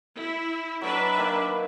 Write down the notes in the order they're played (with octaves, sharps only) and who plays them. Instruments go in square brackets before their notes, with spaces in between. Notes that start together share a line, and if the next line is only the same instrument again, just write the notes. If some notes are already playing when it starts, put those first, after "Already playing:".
[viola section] E4
[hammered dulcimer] F#3 D#5 [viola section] D4 B4 E5
[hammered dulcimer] D#3 A#3